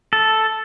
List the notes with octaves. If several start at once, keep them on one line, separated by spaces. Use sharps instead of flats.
A4